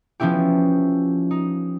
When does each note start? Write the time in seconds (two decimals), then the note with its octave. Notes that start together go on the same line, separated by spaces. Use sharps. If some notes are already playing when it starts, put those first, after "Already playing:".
0.20 F3 B3 C#4 E4 G4
1.31 D#4